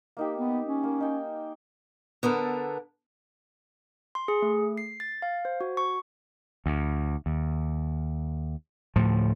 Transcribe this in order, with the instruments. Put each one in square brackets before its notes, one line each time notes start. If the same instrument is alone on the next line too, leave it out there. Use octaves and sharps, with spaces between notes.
[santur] A#3 D#4 G4
[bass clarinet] B3
C#4
[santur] A#3
D#4 G5 G#5
[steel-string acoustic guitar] D3 B3 A4 A#4
[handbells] C6
G#4
A3
C7
A6
F5
C5
F#4
C#6
[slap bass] D2
D#2
D2 A2 F3